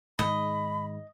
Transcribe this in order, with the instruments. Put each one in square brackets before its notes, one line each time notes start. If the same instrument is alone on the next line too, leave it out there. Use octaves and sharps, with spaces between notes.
[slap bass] G#2 D#3 G#3 [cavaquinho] D#5 [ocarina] B5